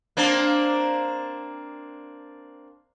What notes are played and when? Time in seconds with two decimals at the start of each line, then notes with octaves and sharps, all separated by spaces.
0.17 A#3 C4 D4